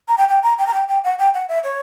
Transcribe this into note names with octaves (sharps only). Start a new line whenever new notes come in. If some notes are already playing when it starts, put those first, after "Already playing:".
A#5
G5
G5
A#5
G5
A#5
G5
G5
F#5
G5
F#5
E5
C#5